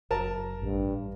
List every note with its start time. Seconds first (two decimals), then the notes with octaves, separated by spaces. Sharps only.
0.11 F#1 A#4 A5
0.62 A1 G2